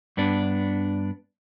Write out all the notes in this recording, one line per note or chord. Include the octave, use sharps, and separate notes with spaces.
G2 B3 D4